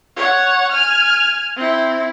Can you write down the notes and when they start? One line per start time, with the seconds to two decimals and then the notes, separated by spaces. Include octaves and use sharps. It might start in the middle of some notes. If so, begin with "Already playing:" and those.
0.16 C#5 F#5
0.71 G#5 F6
1.56 C4 E4